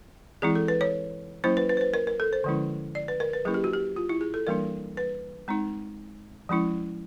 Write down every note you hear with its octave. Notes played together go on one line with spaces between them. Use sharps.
E3 G#3 C4 E4 G#4
A4
B4
C#5
F#3 A#3 C#4 E4 C5
B4
B4
C5
B4
A#4
A#4
A4
C5
D3 F3 G#3 C#4 E4
D5
B4
A#4
B4
F#3 A#3 C#4 E4 G#4
G4
F#4
G4
F4
E4
G#4
A4
E3 G3 A#3 D4 A#4
B4
G#3 C4 D#4
F3 G#3 C#4 E4